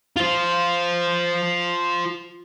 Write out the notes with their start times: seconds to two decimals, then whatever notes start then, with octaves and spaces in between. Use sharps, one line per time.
0.17 F4 C5